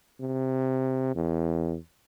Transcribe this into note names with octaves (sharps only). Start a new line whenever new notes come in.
C3
E2